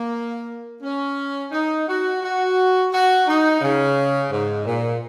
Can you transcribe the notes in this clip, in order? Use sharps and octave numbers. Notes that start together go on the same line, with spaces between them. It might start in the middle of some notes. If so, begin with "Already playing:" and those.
Already playing: A#3
C#4
D#4
F#4
F#4
F#4
D#4
C#3
G#2
A#2